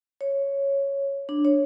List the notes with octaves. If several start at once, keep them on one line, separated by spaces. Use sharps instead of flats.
C#5
D4
C#5